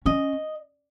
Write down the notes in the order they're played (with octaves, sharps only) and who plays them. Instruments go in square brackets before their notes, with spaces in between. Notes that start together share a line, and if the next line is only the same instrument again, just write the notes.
[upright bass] C#4 [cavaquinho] D#5